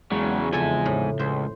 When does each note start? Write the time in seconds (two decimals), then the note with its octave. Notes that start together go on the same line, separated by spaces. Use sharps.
0.12 E2 C#3 F#3 G#3 D5
0.53 F2 G#2 C#3 F4 A4 E5 G#5
0.86 A2
1.20 C#2 C5